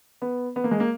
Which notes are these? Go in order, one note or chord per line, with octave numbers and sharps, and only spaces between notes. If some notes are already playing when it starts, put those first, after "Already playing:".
B3
B3
A#3
G#3
A#3